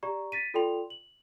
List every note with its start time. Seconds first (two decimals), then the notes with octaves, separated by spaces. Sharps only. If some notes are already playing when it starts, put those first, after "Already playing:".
0.03 G4 D5 A#5 C#6
0.32 A6 B6 D#7
0.54 F4 A4 D5 G5 C6 F7
0.90 F#7